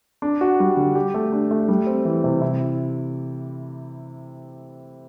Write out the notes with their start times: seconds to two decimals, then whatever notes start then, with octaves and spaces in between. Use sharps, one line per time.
0.22 D4
0.41 F#4
0.60 G3
0.77 D3
0.95 G4
1.14 A3
1.32 D4
1.51 A3
1.69 G3
1.87 C4
2.05 E3
2.24 C3
2.41 E4